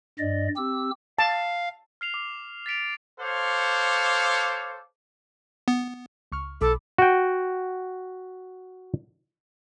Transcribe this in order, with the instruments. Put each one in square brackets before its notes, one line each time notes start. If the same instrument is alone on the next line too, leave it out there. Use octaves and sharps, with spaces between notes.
[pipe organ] G2 D5 D#5
C4 G4 E6
[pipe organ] F5 [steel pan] A5
[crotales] F6 C7 F7
D6
A6 B6 D7 F7
[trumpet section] A4 C5 C#5 F5 D6
[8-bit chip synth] B3
[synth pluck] C#2 C#6 F6
[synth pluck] B1 B5 D6 [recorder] A4
[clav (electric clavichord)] F#4 G5